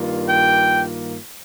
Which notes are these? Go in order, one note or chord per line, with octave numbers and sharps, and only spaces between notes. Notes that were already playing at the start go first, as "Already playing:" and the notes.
Already playing: G2 D#3 A#3 F4
G5